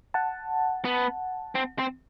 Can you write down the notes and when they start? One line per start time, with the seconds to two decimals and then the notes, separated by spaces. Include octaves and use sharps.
0.14 F#5 A5
0.85 B3
1.55 C4
1.79 C4